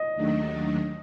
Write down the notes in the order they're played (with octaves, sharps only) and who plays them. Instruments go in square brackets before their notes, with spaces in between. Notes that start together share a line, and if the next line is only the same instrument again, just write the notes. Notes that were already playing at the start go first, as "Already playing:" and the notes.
Already playing: [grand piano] D#5
[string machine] D#2 D#3 F#3 A3 D4